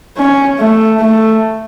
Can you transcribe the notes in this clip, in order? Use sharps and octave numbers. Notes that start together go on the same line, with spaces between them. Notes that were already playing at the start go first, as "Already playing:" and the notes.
C#4
A3
A3